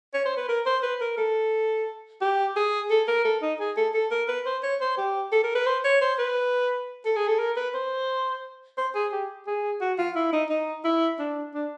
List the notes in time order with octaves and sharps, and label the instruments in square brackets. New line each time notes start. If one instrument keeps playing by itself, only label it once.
[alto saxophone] C#5
C5
B4
A#4
C5
B4
A#4
A4
G4
G#4
A4
A#4
A4
D#4
G#4
A4
A4
A#4
B4
C5
C#5
C5
G4
A4
A#4
B4
C5
C#5
C5
B4
A4
G#4
A4
A#4
B4
C5
C5
G#4
G4
G#4
F#4
F4
E4
D#4
D#4
E4
D4
D4